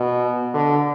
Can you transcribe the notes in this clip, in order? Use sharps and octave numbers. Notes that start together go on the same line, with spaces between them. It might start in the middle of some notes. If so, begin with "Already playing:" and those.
Already playing: B2
D3